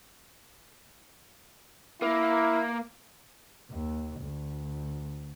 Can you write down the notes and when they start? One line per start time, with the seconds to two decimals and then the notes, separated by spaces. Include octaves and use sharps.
2.02 A#3 E4
3.71 D#2
4.20 D2